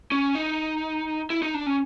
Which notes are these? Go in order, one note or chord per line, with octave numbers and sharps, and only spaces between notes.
C#4
D#4
E4
D#4
D4
C#4